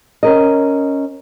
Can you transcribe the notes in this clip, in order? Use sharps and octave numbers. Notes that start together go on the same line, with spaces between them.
C#4 A#4 D#5